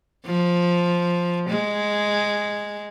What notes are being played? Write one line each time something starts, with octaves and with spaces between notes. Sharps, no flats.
F3
G#3